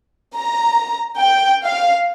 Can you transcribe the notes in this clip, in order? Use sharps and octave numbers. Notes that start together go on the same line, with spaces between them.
A#5
G5
F5